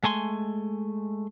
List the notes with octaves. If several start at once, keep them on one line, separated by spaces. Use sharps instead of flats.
G#3 A3 G#5 C6